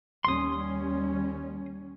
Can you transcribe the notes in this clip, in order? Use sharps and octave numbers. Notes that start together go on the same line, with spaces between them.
D#2 G3 C#4 C6 D#6